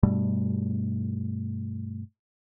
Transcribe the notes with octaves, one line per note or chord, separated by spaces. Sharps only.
G2 B2 G3 A3